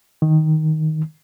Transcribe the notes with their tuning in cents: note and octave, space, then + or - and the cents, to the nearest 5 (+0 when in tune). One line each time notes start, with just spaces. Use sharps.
D#3 +5